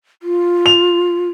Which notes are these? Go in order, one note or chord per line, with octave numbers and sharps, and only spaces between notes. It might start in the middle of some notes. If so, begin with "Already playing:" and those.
F4
F7